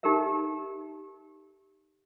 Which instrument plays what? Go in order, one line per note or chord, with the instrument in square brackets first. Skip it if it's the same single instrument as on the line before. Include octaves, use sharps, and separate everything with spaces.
[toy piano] D#4 G4 A4 A#4 E5